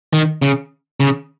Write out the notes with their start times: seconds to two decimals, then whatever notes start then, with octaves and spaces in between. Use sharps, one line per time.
0.13 D#3
0.42 C#3
1.00 C#3